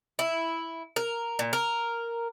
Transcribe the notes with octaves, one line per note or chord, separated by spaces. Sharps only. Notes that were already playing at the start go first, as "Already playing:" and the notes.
E4
A#4
A#2
A#4